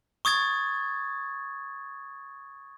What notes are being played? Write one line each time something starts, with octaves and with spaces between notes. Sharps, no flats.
C#6 D#6 G#6 A6